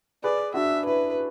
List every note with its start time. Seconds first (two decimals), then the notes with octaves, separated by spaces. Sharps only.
0.23 G#4 B4 D5
0.54 D4 F#4 E5
0.86 E4 B4